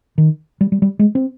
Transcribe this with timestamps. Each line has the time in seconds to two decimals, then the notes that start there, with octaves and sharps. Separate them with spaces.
0.18 D#3
0.61 G3
0.72 G3
0.82 G3
0.99 G#3
1.15 C4